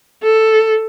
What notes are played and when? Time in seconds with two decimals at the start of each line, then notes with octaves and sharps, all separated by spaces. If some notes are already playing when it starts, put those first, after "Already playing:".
0.23 A4